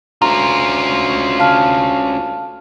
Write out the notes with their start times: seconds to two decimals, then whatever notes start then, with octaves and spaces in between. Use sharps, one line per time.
0.22 D2 C#4 F4 A#5
1.39 F5 A5 F6